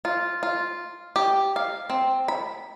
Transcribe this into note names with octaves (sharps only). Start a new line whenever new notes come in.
F4
F4
G4
F5
C4
B5